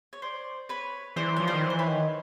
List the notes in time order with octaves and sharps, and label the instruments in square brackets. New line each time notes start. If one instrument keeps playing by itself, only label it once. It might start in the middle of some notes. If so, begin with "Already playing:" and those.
[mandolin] C#5
C5 D5
B4 C#5
[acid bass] E3 [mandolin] C5 D5
[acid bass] F3 [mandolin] C#5
[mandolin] C5 D5
[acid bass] D#3
E3
[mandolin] C5
B4 C#5
[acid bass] D#3